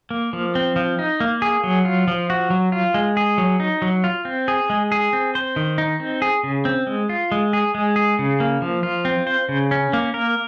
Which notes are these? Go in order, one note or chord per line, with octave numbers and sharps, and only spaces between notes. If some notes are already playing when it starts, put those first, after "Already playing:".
A#3
F3
C4
F3
D#4
A#3
G#4
F#3
F4
F3
F#4
F#3
F4
G#3
G#4
F#3
D#4
F#3
F4
C4
G#4
G#3
G#4
C4
C5
D#3
D#4
C4
G#4
C#3
C4
G#3
F4
G#3
G#4
G#3
G#4
C#3
A#3
F3
F4
C4
C5
C#3
C#4
A#3
A#4